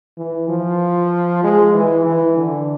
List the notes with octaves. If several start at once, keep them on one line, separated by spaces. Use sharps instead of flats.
E3
F3
G#3
E3
E3
D3